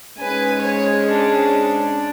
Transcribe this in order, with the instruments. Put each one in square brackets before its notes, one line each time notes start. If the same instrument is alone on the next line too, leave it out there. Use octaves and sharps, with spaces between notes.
[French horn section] G#2 G#3 C#4 [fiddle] B4 G#5
[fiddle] C#5
D4